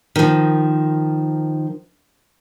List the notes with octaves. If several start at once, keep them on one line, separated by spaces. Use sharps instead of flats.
D#3 F3